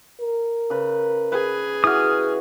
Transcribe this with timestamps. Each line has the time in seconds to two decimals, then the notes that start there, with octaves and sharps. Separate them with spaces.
0.21 A#4
0.70 C#3 B4
1.32 G#4 B4
1.84 E3 F#4 D#6 F6